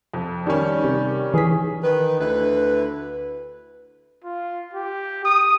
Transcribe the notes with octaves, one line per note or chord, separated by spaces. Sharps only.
F2
D#3 G3 C#4
C3
E3 G#4 B6
D#3 B4
D2 E4 B4
F4
G4
D#6